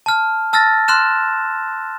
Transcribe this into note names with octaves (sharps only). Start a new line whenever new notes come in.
A5 F6
A5 E6 F6 A6 A#6
C6 F6 F#6 E7